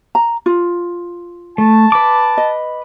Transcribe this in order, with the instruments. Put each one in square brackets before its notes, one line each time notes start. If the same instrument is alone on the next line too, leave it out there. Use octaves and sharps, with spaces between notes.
[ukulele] A#5
F4
[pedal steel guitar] A3 [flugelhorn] A5
[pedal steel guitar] B4 D6
[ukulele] D#5